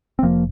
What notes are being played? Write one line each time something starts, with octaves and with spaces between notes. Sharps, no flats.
C4
F1 F3 A#3